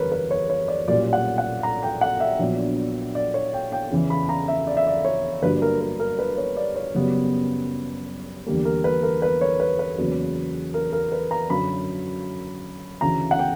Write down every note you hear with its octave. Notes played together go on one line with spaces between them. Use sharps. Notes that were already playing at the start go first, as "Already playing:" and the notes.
Already playing: F#1 E2 D3 G3 A#4 B4 C#5
B4
C#5
C#5
D5
B1 A#2 G3 C#4 D5
F#5
F#5
A#5
G5
F#5
E5
A#1 A#2 F#3 B3 D4
D5
C#5
G5
G5
E2 C#3 E3
B5
A#5
E5
D5
E5
D5
C#5
G1 G2 F#3 A#3 B4
A#4
A#4
A#4
B4
C#5
D5
C#5
F#1 F#2 C#3 G3 B3
E2 D3 G3 A#3
A#4
B4
A#4
B4
C#5
B4
B4
E2 C#3 F#3 A#3
A#4
A#4
B4
A#5
F#2 D3 F#3 B5
D2 C#3 E3 A#5
F#5
G5